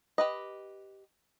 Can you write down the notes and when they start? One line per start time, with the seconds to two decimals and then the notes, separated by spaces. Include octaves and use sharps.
0.18 G4 B4 D#5